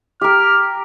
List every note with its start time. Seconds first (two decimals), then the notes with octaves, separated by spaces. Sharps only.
0.21 G4 A#4 F6